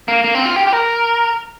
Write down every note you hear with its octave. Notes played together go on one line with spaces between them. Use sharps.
A#3
A#3
C4
F4
G4
G4
A#4